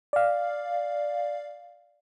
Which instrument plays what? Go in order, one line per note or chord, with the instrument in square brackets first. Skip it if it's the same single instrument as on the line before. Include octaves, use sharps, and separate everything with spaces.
[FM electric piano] D5 F5